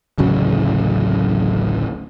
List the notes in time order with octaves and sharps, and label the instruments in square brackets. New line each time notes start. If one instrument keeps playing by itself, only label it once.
[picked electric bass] D1 A1 C#3 F#3